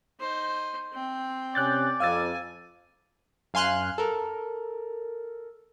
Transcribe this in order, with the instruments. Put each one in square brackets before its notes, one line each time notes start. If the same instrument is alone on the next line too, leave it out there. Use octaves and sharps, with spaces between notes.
[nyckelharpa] D#4 C5
C4 G5
[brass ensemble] C3 C#4 [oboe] D5 [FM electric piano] F#6 G6 A6
[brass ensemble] F2 [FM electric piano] F5 E6 A6 [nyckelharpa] G#5
[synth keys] F#2 F5 G#5 C6 F6 F#6
A4 A#4